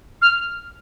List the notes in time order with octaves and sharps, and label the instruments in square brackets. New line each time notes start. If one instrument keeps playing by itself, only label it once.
[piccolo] F6